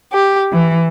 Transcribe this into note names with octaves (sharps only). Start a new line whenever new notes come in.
G4
E3